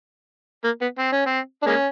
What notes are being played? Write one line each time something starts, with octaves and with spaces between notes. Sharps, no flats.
A#3
B3
C4
C#4
C4
D4
G#3 A#3 C#4